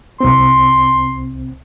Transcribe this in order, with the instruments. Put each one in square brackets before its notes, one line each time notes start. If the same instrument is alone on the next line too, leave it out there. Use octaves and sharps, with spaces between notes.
[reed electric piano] C2 C4 [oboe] C6